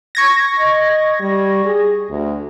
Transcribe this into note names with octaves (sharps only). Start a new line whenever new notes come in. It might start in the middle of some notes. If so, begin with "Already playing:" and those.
C#6 G#6 A#6
D#5
G3
G#4
D2